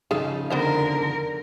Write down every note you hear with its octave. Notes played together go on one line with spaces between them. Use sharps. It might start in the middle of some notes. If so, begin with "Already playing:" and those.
C#3 F3 D#4 G#4 A4 F5
D3 B3 A#4 C5 F5